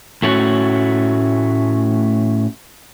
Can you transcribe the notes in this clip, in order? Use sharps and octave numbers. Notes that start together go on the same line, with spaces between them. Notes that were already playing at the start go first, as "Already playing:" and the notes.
A2 A3 C#4 F#4